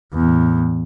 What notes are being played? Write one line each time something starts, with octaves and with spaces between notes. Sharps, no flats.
E2 A2